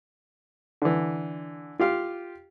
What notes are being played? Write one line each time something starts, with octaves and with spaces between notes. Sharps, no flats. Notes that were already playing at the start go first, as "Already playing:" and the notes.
D3 E3
F4 G4 F5